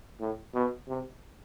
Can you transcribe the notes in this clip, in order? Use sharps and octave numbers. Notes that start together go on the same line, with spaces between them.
A2
B2
C3